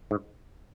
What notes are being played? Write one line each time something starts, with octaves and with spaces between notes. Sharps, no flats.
G#2